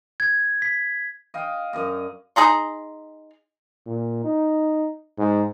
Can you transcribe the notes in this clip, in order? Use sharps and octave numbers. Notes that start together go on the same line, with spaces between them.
G#6
B6
D#5 F5 G5
F#2 D5 D#5
D#4 G#4 A#5 C6
A#2
D#4
G#2